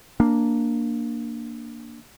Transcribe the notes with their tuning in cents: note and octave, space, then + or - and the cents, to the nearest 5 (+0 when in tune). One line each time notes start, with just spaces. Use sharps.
A#3 +0 D4 +0